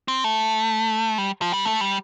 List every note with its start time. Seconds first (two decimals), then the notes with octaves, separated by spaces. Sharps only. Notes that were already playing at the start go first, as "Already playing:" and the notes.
0.08 C4
0.24 A3
1.18 G3
1.41 F3
1.53 G3
1.65 A3
1.81 G3